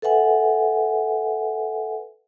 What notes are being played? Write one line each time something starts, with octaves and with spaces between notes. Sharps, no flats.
A4 B4 E5 F#5 G#5